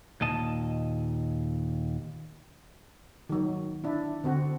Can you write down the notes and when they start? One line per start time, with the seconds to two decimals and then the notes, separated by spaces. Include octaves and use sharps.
0.21 D#2 A#2 D#5 A5
3.29 D#3 F#3
3.84 D4 E4
4.24 D3 C4 F#4